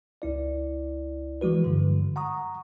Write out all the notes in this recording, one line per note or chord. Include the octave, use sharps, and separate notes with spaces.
C#2 E4 D5
E3 F3 G#3 F#4 B4
G2 D3
F#5 A#5 C#6 D#6